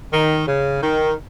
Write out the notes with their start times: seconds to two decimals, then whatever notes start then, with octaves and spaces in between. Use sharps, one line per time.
0.13 D#3
0.47 C#3
0.81 D#3